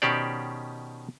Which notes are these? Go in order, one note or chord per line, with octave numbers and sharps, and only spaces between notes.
B2 D#3 C#4 G4 C5 D5